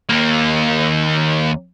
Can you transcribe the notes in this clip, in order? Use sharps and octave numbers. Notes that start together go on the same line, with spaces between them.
D#2 A#3